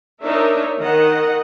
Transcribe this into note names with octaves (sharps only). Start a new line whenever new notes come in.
D4 D#4 A#4 C#5 E5
D#3 D#5 F#5